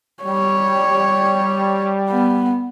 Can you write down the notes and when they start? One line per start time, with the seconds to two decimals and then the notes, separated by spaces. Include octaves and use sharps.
0.24 G3 C#5
2.10 B3